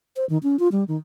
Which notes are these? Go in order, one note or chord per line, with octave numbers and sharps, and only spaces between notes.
C5
D#3
C#4
F4
G3
D#3